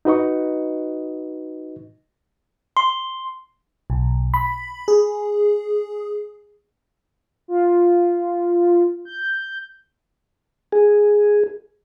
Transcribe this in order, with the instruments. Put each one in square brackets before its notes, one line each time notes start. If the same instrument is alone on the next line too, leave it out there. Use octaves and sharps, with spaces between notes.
[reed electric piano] D#4 F#4 B4 D#5 C#6
[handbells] C6
[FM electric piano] B1
B5
G#4
[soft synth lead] F4
G6
[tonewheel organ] G#4